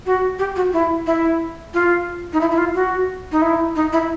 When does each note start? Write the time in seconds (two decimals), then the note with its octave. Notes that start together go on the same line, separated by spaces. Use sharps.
0.06 F#4
0.39 G4
0.56 F#4
0.73 E4
1.06 E4
1.74 F4
2.33 D#4
2.41 E4
2.51 E4
2.58 F4
2.74 F#4
3.32 D#4
3.42 E4
3.76 D#4
3.92 E4